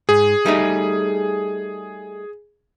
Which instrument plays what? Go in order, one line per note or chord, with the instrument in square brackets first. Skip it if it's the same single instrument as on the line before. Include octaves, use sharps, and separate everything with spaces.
[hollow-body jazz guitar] G#2 [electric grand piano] G#4
[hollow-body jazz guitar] G3 A3 D#4